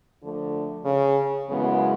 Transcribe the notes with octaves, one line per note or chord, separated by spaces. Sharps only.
D3 F3 A3
C#3
F#2 C#3 E3 G#3 B3